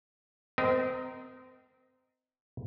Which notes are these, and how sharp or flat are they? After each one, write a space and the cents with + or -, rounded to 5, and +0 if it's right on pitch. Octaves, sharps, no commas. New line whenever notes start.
C4 -30 A#4 +0 D#5 +5